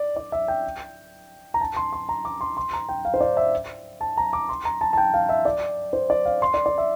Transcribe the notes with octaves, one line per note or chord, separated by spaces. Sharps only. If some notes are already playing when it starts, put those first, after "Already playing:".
Already playing: D5
D5
E5
G5
A#5
A5
C6
C6
A#5
D6
C6
C6
A#5
G5
F5
C5
D5
E5
A5
A#5
D6
C6
A#5
A5
A5
G5
F5
E5
D5
C5
D5
F5
C6
D5
D5
E5